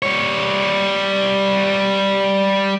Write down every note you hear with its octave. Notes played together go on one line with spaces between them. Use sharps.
G3 C#5